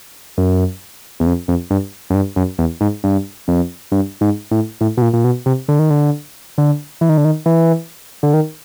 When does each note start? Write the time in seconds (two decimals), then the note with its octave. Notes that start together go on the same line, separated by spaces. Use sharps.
0.38 F#2
1.20 E2
1.26 F2
1.48 F2
1.71 G2
2.10 F#2
2.14 G2
2.36 F#2
2.59 E2
2.81 G#2
3.04 G2
3.48 F2
3.92 G2
4.21 G#2
4.51 A2
4.81 A2
4.97 B2
5.02 A#2
5.13 A#2
5.24 B2
5.46 C3
5.68 D3
5.79 D#3
5.90 D3
6.58 D3
7.01 E3
7.09 D#3
7.18 D3
7.25 D#3
7.46 E3
8.23 D3
8.34 D#3